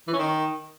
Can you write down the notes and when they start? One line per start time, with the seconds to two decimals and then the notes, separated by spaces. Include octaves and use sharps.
0.07 E3
0.13 C#4
0.19 D#3